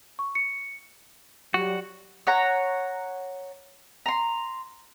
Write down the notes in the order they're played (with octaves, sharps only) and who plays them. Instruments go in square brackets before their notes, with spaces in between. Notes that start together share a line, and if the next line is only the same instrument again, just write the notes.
[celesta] C#6
C#7
[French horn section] F#3 G3 [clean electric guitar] F#4
[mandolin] C#5 F#5 A#5
A#5 C6